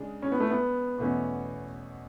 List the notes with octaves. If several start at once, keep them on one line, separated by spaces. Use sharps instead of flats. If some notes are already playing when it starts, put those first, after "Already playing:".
Already playing: C#3 G#3 D4
C#4
B3
A3
B3
E2 B2 A3 C#4